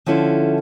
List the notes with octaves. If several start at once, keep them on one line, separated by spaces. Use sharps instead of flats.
D3 F3 C#4 E4 A4